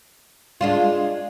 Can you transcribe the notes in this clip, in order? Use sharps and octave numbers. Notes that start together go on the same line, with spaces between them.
G#3 D4 F4